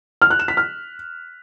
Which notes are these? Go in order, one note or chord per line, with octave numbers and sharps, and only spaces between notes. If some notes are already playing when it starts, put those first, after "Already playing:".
F6
F#6
E7
B6
F6